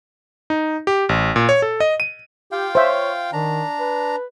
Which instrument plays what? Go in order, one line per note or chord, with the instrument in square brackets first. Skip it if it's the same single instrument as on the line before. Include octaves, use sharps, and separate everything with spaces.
[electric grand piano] D#4
G4
A1
A#2
C#5
A4
D#5
D#7
[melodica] F4 F5 G5 [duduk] G4
[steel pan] C5 E5 [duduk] C#5
[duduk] D#3 [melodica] D4 A#5
[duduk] B4